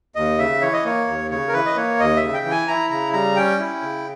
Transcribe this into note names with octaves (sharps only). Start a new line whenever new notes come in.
D#2 D#5
C#3 E5
E3 C#5
D#5
A#3 C#5
D#2
C#3 C#5
A#4
E3 B4
D#5
A#3 C#5
D#2 D#5
E5
C#3
G5
E3
G#5
E4 A#5
C#3 A#5
G3 A#5
C#4 G5
E4
C#3